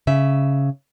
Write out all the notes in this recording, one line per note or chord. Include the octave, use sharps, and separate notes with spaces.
C#3 E5